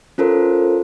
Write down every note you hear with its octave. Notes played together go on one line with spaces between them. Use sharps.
C#4 F4 A4 A#4 C5